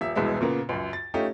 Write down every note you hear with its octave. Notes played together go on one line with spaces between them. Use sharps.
D#1 E5
E1 C2 B2 G#3 E5
A#2 C#3 A#3 B3
C#2 F#2
A6
A3 C#4 D#4 F4 G4